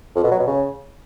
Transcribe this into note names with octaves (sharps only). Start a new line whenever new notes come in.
F2
B2
F#3
B2
C#3